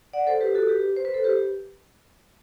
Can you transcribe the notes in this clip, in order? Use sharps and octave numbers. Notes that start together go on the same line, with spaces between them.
D5 F#5
A4 C5
G4 B4
F#4 A4
G4 B4
C5
B4
A4 C5
G4 B4